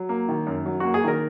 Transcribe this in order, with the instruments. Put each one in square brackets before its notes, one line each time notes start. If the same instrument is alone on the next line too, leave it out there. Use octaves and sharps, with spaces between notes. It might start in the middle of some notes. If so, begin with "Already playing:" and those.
Already playing: [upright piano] F#3
A#3
D#3
F#2
F#3
[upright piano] A#3 [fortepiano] F#4
[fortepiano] G#4
[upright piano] D#3 [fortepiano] A#4